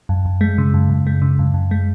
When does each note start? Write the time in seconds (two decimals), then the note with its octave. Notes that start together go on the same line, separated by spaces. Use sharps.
0.09 F#2
0.25 F#2
0.41 G#3
0.58 C#3
0.74 F#2
0.90 F#2
1.07 G#3
1.22 C#3
1.39 F#2
1.54 F#2
1.71 G#3